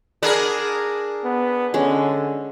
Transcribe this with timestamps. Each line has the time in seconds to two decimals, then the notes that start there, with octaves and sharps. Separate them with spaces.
0.23 D4 G#4 A#4 F#5 B5
1.24 B3
1.74 D3 G#3 C#4